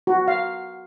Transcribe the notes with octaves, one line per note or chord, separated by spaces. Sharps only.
F#4
F5